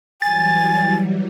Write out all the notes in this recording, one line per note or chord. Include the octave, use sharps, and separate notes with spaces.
E3 F#3 G3 G#5 A6